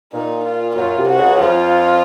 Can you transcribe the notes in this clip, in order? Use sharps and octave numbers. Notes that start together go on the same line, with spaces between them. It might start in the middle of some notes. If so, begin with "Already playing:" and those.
A#2 D#4
F4
F#2 F#3 F4
C2 C3
F#4
C#2 C#3
F2 F3 F4